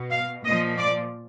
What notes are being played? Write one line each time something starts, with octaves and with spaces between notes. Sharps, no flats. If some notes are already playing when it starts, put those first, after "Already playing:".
Already playing: B2
F5
A#2 F3 D#5
D5